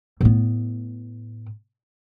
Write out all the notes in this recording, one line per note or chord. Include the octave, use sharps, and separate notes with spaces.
A2 B3